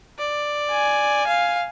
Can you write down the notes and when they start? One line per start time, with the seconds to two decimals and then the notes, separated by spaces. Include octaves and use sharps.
0.19 D5
0.71 G#5
1.27 F5